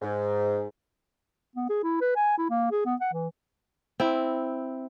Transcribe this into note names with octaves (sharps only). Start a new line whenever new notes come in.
G#2
B3
G#4
E4
B4
G#5
E4
A#3
G#4
B3
F#5
E3
C4 E4